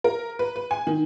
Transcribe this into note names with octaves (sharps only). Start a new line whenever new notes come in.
A#4
B4
B4
G#5
D#3